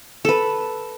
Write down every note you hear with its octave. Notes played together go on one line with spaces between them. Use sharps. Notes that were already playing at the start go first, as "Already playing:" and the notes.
A4 B4